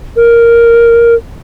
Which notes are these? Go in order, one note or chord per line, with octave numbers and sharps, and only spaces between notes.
A#4